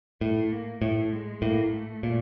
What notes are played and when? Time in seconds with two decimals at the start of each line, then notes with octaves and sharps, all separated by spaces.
0.21 A2 A3
0.52 A#3
0.82 A2 A3
1.13 G#3
1.42 A2 A#3
1.73 A3
2.03 A#2